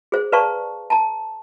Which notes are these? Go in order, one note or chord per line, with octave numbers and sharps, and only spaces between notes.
G#4 C5
B4 D5 F5 A5 A#5 C#6
A5 A#5